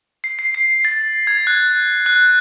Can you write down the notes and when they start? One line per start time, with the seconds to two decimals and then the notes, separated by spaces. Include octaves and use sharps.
0.24 C7
0.39 C7
0.55 C7
0.85 A6
1.27 G#6
1.47 F#6
2.06 F#6